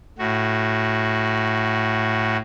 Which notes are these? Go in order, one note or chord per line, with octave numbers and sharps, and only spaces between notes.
A2 F#4